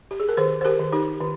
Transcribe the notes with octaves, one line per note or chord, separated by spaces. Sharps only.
G4
G#4
A#4
D#3 G#4 C5
C5
G4 A#4
D#3
D#4 G4
D#3